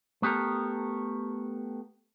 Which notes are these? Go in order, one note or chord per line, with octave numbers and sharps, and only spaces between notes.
A3 B3 G4 A4 A#4